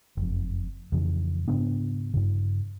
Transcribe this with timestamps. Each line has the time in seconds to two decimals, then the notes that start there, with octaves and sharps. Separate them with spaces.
0.17 F#1 F2
0.92 F2 C#3 E3
1.48 G#2 C#3 B3 D4
2.14 G2 C#3